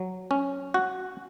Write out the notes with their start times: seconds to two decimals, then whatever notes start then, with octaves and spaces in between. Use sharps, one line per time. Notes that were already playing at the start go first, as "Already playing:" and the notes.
Already playing: F#3
0.31 C#4
0.74 F#4